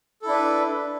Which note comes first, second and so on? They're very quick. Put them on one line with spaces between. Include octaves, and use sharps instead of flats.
A4 E4 D4 B4